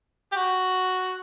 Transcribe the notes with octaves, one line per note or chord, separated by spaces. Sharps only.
G4
F#4